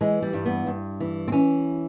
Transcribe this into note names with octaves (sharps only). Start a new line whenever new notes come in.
E3 G#3
G3
G2
B3
G2
E3
C4
E3 C#4